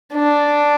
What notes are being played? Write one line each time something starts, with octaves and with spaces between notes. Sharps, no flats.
D4